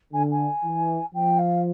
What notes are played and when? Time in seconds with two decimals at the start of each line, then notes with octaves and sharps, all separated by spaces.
0.13 D3 G#5
0.32 G#5
0.64 E3
1.14 F3 G5
1.39 F5